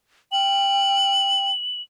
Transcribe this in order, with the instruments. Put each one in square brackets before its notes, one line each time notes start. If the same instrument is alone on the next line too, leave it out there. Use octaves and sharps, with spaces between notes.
[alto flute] G5 [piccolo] F#7